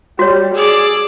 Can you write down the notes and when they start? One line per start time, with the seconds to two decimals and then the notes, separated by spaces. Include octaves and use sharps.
0.19 G3 F#4 C#5
0.55 G#4 D5 E6